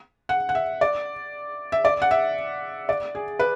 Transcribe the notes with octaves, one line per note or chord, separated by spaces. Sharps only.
F#5
F#5
E5
D5
E5
D5
F#5
E5
D5
G#4
B4